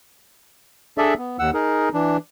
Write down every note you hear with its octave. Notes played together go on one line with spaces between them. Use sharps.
D4 G#4 A4 D5 E5
B3
D#2 F#5 E6
D#4 G#4 A#4
E3 D4